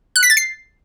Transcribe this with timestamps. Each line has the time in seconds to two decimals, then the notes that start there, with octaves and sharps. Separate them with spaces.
0.16 F#6
0.23 B6
0.30 A6
0.37 C7